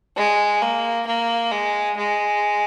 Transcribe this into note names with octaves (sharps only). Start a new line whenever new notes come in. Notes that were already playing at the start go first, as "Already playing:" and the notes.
G#3
A#3
A#3
G#3
G#3